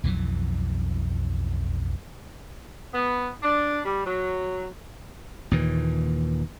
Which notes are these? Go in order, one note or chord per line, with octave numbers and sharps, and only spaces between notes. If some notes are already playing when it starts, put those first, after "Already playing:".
B1 F2 E3 F#3
B3
D4
G3
F#3
D#2 A#2 E3